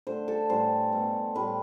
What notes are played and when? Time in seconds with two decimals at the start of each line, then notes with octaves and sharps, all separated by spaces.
0.07 D3 A3 C5
0.28 A4
0.50 A2 E3 G3 C5
0.93 B2 A3
1.35 A2 G3 B4